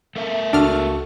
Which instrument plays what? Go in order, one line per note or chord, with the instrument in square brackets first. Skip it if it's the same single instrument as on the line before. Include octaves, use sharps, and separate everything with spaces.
[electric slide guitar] A3 A#4 E5
[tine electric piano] C#2 F#4 A4 [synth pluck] D4 F6